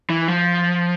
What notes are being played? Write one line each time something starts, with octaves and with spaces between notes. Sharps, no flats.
E3
F3